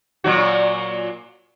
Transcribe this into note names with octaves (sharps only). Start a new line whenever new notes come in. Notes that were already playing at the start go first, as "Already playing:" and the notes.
A#2 F#3 F#4